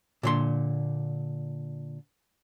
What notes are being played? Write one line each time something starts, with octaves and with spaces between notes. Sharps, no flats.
A#2 D3 C6